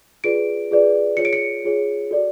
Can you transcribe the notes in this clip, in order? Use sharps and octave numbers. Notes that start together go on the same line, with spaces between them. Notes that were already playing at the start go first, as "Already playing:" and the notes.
F4 G#4 B4 D5 D7
F4 G#4 B4 D5
F4 G#4 C#5 C#7
D7
C#7
F4 G#4 C#5
F#4 A4 D5